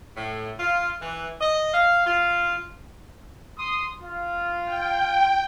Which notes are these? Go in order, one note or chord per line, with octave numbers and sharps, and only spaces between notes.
A2
F4
E3
D#5
F5
F4
C6 D#6
F4
G5